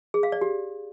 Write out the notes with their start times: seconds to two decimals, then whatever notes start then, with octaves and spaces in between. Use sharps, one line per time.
0.14 G#4
0.23 F5
0.32 D5
0.41 G4